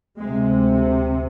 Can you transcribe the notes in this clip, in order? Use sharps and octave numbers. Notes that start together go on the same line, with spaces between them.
D2 C3 G#3